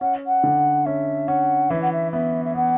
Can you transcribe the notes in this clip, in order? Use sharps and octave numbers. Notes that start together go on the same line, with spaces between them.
C#4 F#5
F#5
D3
C#4 E5
C#4 F#5
E3 E5
F#5
E5
B3 E5
E5
B3 F#5